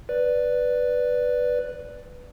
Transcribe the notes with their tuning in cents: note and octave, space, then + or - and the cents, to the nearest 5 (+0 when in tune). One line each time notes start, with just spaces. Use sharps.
B4 +0 D5 +0